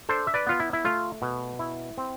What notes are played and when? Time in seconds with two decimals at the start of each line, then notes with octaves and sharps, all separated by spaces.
0.09 D4 A4 C5
0.27 E5
0.34 B4 D5
0.47 B3 F4
0.60 E4
0.73 E4
0.85 A3 F4
1.22 B2
1.59 E4
1.98 C4